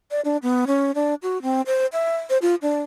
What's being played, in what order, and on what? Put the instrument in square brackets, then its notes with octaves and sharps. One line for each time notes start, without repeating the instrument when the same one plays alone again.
[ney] D5
D4
B3
C#4
D4
F#4
C4
C5
E5
C5
F4
D4